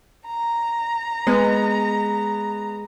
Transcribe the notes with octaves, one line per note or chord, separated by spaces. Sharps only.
A#5
G#3 B3